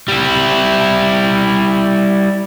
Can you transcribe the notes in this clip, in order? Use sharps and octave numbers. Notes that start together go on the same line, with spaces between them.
G3 E4